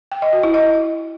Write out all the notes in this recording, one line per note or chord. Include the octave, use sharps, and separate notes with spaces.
G5
D#5
F#4
E4
D#5